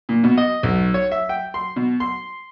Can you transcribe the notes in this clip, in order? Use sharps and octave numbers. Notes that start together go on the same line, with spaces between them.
A#2
B2
D#5
B1
C#5
E5
G5
C6
B2
C6